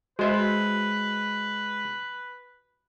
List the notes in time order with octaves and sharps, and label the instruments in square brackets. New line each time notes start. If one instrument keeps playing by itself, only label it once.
[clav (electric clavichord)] G#3 C5 E5 [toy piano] F#4 D#5 [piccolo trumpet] B4